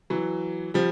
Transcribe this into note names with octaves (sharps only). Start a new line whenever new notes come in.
E3 F#3
F3 G3